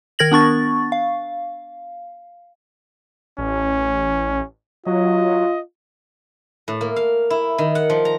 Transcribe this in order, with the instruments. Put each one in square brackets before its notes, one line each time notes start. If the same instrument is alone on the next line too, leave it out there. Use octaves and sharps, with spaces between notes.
[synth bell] D#3 A#4 G#6 A#6 F#7
B3 D4 C#6 A6
F5
[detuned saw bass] A1 [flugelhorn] C#4
[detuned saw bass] F#3 [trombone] F4 [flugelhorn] D#5
[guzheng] A2
A#3
F5
E4
D#3
F#5
F3
A#5